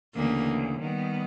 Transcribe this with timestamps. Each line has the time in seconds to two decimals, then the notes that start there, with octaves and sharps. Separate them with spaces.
0.14 D2 C#3 E3 A#3
0.78 D#3 G3 B3